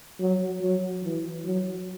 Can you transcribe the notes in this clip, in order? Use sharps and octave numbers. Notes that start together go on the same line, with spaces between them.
F#3
F#3
E3
F#3